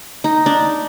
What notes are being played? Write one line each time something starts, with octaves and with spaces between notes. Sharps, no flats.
D#4
D4